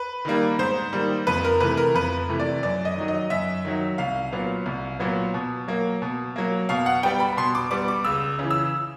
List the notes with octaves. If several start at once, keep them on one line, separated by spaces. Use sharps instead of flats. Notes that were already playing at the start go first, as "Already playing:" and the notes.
Already playing: B4
D#3 G3 A#3
G#2 C5
D#3 G3 A#3
F2 B4
A#4
C3 E3 A3 B4
A#4
F2 B4
C3 E3 A3
D5
F#2 D5
D#5
D#3 F#3
D#5
F#2 E5
D#3 F#3
C2 F5
A#2 F#3 B3
C2
A#2 F#3 B3
B2
F#3 A#3
B2
F#3 A#3
B2 F5
F#5
G3 B3 G5
B5
B2 C6
D6
G3 B3 D6
D6
C#2 E6
C#3 E3
E6